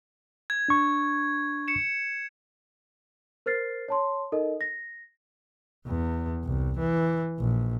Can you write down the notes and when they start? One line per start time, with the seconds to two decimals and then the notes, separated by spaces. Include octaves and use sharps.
0.50 G#6
0.69 D4 C#6
1.68 C#7 E7
3.46 A#4 C5 F6 A6 C7
3.88 C#5 A5 C6
4.32 D#4 A4 A#4 D#5
4.61 A#6
5.87 E2
6.45 C2
6.79 E3
7.40 A#1